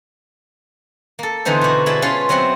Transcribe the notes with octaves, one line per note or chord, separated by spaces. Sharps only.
A#3 A4
D3 E3 B3 D#4 C5
B2 F#4
G#3 E4 D5 G#5 A5 B5
C#4 F4 B4 F5 C6
F#3 B3 C4 E5 F#5